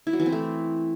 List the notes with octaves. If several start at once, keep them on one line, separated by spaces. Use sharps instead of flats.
E4
F#3
E3
C4
A3